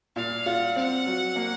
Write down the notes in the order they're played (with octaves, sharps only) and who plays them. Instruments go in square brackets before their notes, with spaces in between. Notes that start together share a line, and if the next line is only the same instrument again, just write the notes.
[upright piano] A#2 [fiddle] F5
[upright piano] F4 [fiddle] F#5
[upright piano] C4 [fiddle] F#5
[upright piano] F#3
A#3